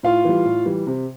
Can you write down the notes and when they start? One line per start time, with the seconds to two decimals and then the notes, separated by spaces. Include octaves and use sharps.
0.03 A2 F4 F5
0.25 E3 G3
0.45 A2
0.66 E3 G3
0.87 C3